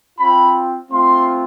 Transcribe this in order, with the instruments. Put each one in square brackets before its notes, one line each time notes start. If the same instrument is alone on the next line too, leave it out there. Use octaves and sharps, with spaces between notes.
[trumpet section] C4 F4 B5
A3 C4 F4 C6